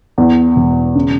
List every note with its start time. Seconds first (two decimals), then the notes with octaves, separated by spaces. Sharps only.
0.18 E2
0.56 E1
0.95 C#3